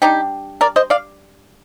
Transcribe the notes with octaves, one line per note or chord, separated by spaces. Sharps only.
G3 D4 D#4 G4
A#4 D5
C5 D#5
D5 F5